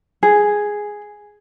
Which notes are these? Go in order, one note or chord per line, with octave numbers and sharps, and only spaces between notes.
G#4